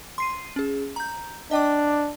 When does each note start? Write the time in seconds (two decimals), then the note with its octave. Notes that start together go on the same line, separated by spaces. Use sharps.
0.18 C6 C7 D#7
0.56 C#4 G#4
0.96 A#5 G6
1.51 D4 D#5 G5 D6